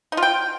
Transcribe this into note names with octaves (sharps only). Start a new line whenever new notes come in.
D#4
F4
G5